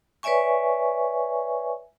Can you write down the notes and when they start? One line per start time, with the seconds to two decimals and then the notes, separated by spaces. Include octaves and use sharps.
0.23 B4 C#5 D5 E5 G#5 C#6